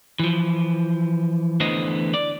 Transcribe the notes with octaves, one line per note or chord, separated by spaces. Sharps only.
E3 F3
D2 D3 E3 B3 C5 D#5
D5